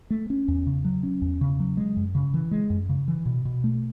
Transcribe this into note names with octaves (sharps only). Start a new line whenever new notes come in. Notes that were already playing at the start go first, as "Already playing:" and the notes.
A3
C#4
E2
C#3
F#3
C#4
E2
C#3
F#3
G#3
F#2
C#3
E3
G#3
F#2
C#3
E3
B2
B2
A3